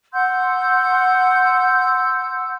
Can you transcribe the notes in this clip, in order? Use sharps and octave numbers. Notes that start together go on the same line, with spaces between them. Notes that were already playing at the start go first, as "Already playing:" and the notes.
F#5 C6 E6 G6